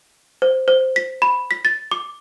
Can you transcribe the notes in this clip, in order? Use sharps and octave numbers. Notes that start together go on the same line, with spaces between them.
C5
C5
B6
B5
B6
A6
D6